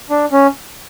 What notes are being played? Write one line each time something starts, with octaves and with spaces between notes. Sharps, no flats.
D4
C#4